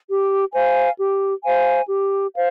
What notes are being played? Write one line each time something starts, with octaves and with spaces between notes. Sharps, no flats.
G4
C5 F5 G#5
G4
C5 F5 G#5
G4
C5 F5